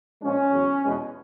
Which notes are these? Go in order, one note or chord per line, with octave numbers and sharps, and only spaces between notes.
A#2 F3 G#3 C#4
E2 C#3 F#3
E2 B2 G#3